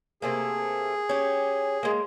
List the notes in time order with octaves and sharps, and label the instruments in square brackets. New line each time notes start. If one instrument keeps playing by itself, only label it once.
[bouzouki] C3 A3 A#3 [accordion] G#4
[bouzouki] C#4 G4
G#3 A#3